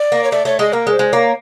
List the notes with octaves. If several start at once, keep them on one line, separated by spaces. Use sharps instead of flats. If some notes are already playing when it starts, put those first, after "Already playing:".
Already playing: D5
A#3
C#5
A3 D5
A3 C#5
G#3 D#5
A#3 A#4
G#3
C5
G#3
A#3 C#5